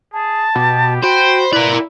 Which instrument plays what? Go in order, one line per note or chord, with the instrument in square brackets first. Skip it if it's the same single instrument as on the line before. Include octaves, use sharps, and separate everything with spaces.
[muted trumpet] G#4 [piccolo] A5
[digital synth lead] B2 [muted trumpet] G4
[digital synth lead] F#4 [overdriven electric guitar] C5 [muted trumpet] G5 [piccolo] B5
[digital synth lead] E4 [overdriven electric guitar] A#4 D5 [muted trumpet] B4